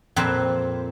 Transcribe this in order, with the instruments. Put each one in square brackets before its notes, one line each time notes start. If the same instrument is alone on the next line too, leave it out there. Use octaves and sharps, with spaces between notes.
[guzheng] F2 A#2 C4 B4 A5